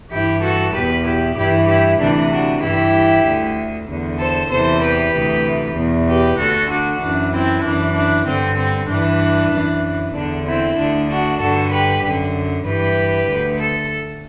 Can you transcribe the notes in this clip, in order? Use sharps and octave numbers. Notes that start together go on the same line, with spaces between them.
G2 E3 E4 G4
F#4 A4
E2 B2 G4 B4
E4 G4
G2 E3 E4 G4
E4 G4
D2 C3 E3 D4
D4 F#4
G2 E3 E4 G4
D2 D3
E2 D3
A4 C5
E2 C3 E3 A4 C5
G4 B4
D2 C3 E3
E2 B2
G4 B4
D2 D3 F#4 A4
D4 F#4
F#2 E3 D4
C4 E4
F#2 E3 D4
D4
G2 D3 C4
C4
G2 E3 D4
F#2 E3
E2 D3 D4
C4 E4
D2 D3 D4
D4 F#4
G2 D3 F#4 A4
G4 B4
F#2 D3
G2 E3 G4 B4
D2 D3
A4